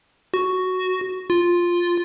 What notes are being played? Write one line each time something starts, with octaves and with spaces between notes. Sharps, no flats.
F#4
F4